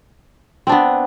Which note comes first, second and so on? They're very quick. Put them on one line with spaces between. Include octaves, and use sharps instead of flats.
C4 D4 B3